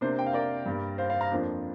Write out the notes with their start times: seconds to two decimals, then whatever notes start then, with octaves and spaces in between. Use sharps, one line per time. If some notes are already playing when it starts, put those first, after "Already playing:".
0.01 C3 A#3 D4 C5
0.19 G5
0.26 F5
0.33 A#4 D5
0.66 G2 G3 A#3
0.98 C5 F5
1.10 C5 F5
1.21 F5 A#5
1.31 F2 F3 A#3 D4